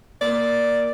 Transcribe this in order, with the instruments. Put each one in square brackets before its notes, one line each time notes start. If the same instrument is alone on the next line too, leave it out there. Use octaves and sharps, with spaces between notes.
[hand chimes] A#3 A#4 [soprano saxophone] D5